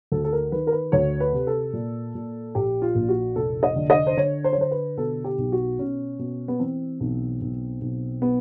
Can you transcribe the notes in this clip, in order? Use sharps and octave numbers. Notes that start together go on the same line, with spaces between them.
D2 A4
A4
A#4
D#3 B4
A#4
B4
D2 C#5
B4
C3
A4
A#2
A#2
A#1 G4
F4
A#1
F#4
F1 A4
D#5
D3
D#5
C5
D3 C#5
C5
C#5
D3 C5
B4
B2 A4
G4
B1
F#4
B2 C#4
B2
B3
E3 C4
B1
B1
B1
B3